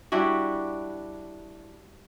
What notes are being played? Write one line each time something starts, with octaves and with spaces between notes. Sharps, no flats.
G3 D4 E4 F#4